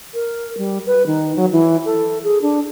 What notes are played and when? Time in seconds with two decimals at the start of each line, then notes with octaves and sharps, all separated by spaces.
0.14 A#4
0.58 G3
0.86 B4
1.07 D#3
1.36 F#3
1.52 E3
1.85 A4
2.23 G#4
2.42 D4